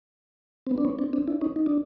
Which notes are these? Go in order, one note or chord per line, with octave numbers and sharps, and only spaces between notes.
C4
B3
D4
B3 C#4
C4 D4
C4 D4
D4 E4
C#4 D#4
D#4
D4